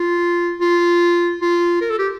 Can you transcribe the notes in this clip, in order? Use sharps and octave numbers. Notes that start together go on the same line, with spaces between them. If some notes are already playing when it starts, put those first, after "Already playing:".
Already playing: F4
F4
F4
A#4
A4
G4